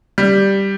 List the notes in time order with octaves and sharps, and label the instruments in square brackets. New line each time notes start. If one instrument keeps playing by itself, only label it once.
[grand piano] G3